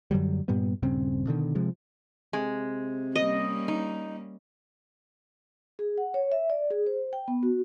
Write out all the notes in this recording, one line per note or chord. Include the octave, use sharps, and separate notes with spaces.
F#2 D3 F#3 G3
G2 A#2 G3 B3
D#1 G2 C#3 C4
B2 D3 D#3
C3 F3 G#3
C3 G#3
G3 A#3 C#4 D#5
D#4
G#4
F#5
C#5
E5
D5
G#4
C5
G5
B3
F#4